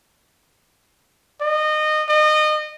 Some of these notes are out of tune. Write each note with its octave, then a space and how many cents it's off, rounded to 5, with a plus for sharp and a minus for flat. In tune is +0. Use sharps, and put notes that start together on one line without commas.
D#5 -25
D#5 -30